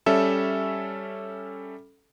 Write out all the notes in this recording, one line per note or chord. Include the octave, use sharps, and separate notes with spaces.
G3 C#4 A4 E5